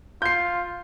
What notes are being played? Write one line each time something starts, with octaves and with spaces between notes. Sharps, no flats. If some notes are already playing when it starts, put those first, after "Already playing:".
F4 G6 C7